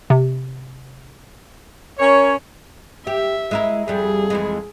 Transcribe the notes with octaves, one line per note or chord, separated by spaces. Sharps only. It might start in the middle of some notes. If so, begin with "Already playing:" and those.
C3
C#4 A#4 C#5
G4 E5
G#3 E4 A#4
F2 G3 G#4
F2 E3 G#3